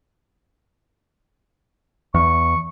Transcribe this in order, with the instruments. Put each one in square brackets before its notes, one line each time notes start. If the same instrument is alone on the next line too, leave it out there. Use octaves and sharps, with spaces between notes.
[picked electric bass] E2 [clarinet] C#6